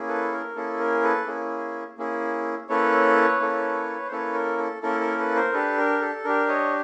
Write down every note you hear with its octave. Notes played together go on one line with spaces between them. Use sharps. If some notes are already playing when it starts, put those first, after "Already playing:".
Already playing: A#3 C#4 E4 G#4
A4 B4
A#4
A#3 C#4 E4 G#4 A4
A#4
A4 B4
A#3 C#4 E4 G#4
A#3 C#4 E4 G#4
A#3 C#4 E4 A4 B4 C#5
A#3 C#4 E4 A4
C5
A#3 C#4 E4 A4 B4 C#5
A#4
A4
A#3 C#4 E4 A4 A#4
A#4
A4 B4
A#4 C5
D4 G4 A4 B4
A#4
A4
D4 G4 A#4
C#5 D#5